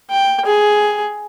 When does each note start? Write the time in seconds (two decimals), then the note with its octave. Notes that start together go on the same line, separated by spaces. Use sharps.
0.10 G5
0.46 G#4